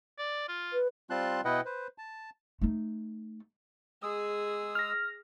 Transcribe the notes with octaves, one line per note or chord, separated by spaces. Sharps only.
D5
F4
B4
G3 C4 F4 A5 C6 F#6
B2 E4 B4 D#5 F#5 G5
B4 C5
A5
A3 D#4
G#3 G#4 D#6 E6
F6 A#6